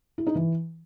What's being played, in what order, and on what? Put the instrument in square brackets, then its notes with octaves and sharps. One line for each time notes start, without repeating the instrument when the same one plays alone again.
[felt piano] E4
D#4
E3